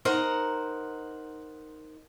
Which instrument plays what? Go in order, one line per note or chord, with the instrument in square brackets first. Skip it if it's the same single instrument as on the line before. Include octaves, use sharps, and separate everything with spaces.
[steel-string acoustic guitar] D#4 A#4 C5 F#5 A#5